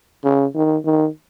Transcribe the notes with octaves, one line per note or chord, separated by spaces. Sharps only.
C#3
D#3
D#3